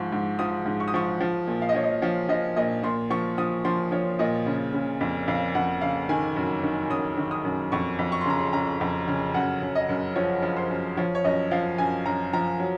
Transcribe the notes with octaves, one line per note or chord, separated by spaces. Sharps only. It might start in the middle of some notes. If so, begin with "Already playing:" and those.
Already playing: G#2 F3 C#6
G#2
F3 D#6
G#2
C#6
D#6
F3 C#6
F3
A#2
F5
D#5
F3 C#5
D#5
F3 C#5
F3 D#5
A#2 D#5
A#2 C6
F3 C#6
F3 D#6
F3 C6
F3 C#5
A#2 D#5
C#3
C#3
F2
F2 F5
F2 F#5
C#3 F5
D#3 G#5
F#2
D#3
F#2 D#6
D#3
D#6
F#2
F2 C#6
F2
C#6
C6
C#3 A#5
C6
C#3 A#5
F2
C#3
F#2 F#5
F#2
D#5
F#2
F3 C#5
F3
C5
F#2
F3 C#5
C#5
F#2 D#5
F3 F5
F#2 G#5
F#2 A#5
F3 A#5
F#3